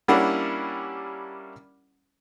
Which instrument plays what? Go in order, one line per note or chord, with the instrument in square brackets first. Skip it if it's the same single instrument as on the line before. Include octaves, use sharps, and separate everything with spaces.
[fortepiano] G3 A#3 C#4 D4 E4 F#5